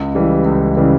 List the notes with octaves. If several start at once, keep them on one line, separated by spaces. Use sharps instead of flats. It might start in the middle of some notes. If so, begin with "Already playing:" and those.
Already playing: C#2
C#3 E3 G3
C#2
C#3 E3 G3